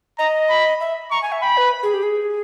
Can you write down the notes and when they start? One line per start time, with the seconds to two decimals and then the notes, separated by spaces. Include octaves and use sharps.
0.19 D#5 A#5
0.50 B5
0.80 E5
1.11 A#5 C#6
1.22 G#5
1.32 E5
1.42 G5 B5
1.57 B4
1.83 G#4
1.93 G4
2.03 G#4